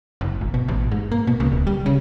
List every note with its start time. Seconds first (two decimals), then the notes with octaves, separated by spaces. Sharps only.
0.21 F#1
0.41 G#1
0.54 B2
0.68 A1
0.92 G#2
1.12 A#3
1.27 B2
1.40 C#2
1.52 D1
1.67 G3
1.86 C#3